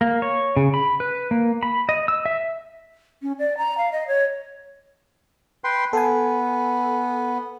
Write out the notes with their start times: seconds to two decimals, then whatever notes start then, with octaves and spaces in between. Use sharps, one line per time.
0.01 A#3
0.22 C#5
0.57 C#3
0.74 B5
1.00 B4
1.31 A#3
1.63 B5
1.89 D#5
2.08 E6
2.26 E5
3.22 C#4
3.39 D5
3.58 A#5
3.78 F5
3.92 D#5
4.08 C#5
5.64 B4 G5 C6
5.93 B3 A4 G#5